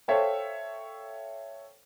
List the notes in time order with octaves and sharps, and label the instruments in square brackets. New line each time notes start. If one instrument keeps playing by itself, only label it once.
[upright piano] A4 C5 C#5 E5 F5 G5